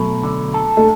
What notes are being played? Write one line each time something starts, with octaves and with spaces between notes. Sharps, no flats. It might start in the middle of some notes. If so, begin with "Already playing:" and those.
Already playing: B2 F#3 A3
D3
A4
A3